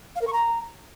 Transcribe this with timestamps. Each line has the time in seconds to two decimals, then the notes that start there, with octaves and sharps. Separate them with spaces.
0.16 F5
0.21 A#4
0.27 C#6
0.33 A#5